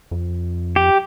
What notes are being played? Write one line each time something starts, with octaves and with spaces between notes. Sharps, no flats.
F2
G4